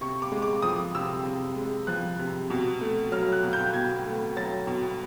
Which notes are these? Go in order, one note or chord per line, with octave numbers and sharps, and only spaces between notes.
C3 C#6
D6
G#3
D6
F3 D#6
C3 E6
C3
G#3
F3 F#6
C3
B2
A3
F#3 F6
F#6
B2
G6
B2 G#6
A3
F#3 A6
B2